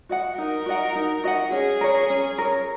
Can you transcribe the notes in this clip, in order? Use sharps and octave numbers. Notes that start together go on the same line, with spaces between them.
F#4 D#5 F#5
D#4 A#4
F#4 D#5 F#5
D#4
F#4 D#5 F#5
C#4 G#4
A#4 C#5
C#4
A#4 C#5